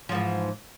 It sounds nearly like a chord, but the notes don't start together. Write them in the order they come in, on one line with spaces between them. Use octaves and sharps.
F3 G#2 E3